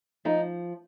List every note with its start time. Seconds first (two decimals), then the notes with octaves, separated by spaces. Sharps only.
0.25 F3 D#4